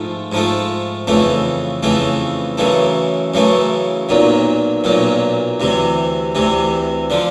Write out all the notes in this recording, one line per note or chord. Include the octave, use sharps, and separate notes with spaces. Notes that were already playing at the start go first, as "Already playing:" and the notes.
Already playing: G#2 F3 A3
G#2 F3 A3
F2 C#3 E3 A3
F2 C#3 E3 A3
F#2 C#3 E3 A3
F#2 C#3 E3 A3
B1 A#2 F#3
B1 A#2 F#3
D2 C3 E3
D2 C3 E3
D3 F3